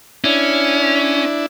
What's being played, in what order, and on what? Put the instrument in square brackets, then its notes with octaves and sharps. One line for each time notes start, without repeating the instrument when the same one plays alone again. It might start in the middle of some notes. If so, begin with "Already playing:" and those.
[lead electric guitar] C#4 [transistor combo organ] D4 E4